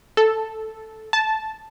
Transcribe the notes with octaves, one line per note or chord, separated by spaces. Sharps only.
A4
A5